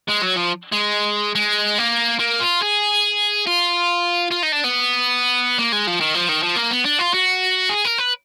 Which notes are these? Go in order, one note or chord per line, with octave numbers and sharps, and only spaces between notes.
G#3
F#3
F3
G#3
G#3
A#3
A#3
F4
G#4
F4
F4
D#4
D4
B3
A#3
G#3
F3
D#3
F3
D#3
F3
A#3
B3
D4
F4
F#4
G#4
A#4
B4